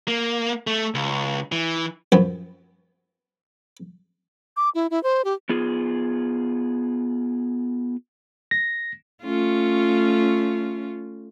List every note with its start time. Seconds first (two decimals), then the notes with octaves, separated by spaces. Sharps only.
0.08 A#3
0.67 A3
0.94 C#2
1.52 E3
2.12 F#2 F3 B3
4.57 D6
4.75 E4
4.91 E4
5.03 C5
5.25 G4
5.49 B3 F4 G#4
8.51 A#6
9.23 A3 C#4 F4